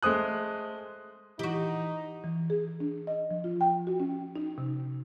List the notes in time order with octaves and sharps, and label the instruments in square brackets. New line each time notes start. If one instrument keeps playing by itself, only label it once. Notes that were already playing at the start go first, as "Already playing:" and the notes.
[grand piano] G#3 A3 C5 D#6 F#6
[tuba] E3 [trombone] D#4 [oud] F#4 G4
[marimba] E3
G#4
D4
D#5
F3
F4
G5
F#4
C#4
D#4
C3